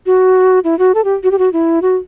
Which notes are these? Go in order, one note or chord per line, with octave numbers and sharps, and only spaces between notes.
F#4
E4
F#4
A4
G4
F#4
G4
F#4
E4
F#4